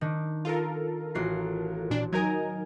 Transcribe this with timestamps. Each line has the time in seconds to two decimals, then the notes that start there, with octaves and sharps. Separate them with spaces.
0.01 D#3 D4
0.45 F4 A4 A#4
1.15 A1 F#4 C7
1.91 A#2 D4
2.12 F#3 D#4 A#4 G#5 A#5 G#6